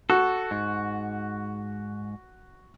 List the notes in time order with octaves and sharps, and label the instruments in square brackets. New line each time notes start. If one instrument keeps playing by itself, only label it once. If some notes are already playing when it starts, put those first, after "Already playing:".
[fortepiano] F#4 [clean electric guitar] A4
[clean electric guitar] G#2